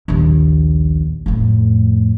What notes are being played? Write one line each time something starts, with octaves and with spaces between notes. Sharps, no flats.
A#1 D#2
F2 A2